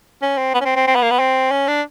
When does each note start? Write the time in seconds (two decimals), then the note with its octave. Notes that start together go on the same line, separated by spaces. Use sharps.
0.22 C#4
0.38 C4
0.54 B3
0.61 C#4
0.65 C4
0.76 C4
0.87 C4
0.95 B3
1.02 A#3
1.11 B3
1.19 C4
1.51 C#4
1.68 D4